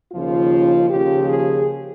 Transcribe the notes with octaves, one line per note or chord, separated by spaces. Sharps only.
D#2 C#3 F3 F4
D#2 C#3 F3 G4
G#4